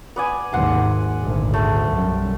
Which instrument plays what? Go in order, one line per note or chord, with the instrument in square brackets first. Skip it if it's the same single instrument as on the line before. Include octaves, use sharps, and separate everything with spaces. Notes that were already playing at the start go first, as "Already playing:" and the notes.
[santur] B3 D5 G#5
[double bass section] G#1 D#2 [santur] F#5 C6
[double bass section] G#1 D2 A#2
[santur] A3
[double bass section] B1 F#2 G3